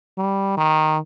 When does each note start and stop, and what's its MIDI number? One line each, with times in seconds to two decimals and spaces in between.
0.18 0.55 55
0.58 0.98 51